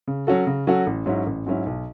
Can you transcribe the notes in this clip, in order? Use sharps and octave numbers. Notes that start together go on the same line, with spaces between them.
C#3
F#3 C#4 F#4 A4
C#3
F#3 C#4 F#4 A4
A1
G#2 F#3 C#4 E4
A1
G#2 F#3 C#4 E4
B1